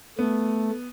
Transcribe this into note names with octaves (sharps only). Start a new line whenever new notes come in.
A3 B3